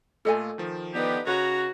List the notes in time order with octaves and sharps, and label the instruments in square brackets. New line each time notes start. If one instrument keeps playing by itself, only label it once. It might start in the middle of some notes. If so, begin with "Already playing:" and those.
[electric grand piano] A#2 A3 F4 [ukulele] A4 D#5 G#5
[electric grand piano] D#3 F3
[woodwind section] D3 B3 G4 [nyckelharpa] D#4 B4
[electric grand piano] C#3 [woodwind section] F#4 [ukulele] B4 [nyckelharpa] C#5 A#5